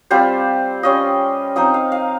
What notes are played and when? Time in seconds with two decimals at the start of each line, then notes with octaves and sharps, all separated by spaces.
0.11 G3 C4 F4 C5
0.83 G3 C#4 F4 D#5
1.56 F3 C4 D#4 D#5
1.74 F5
1.92 F5